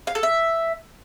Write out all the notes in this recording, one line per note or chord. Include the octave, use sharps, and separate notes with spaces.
F5
A4
E5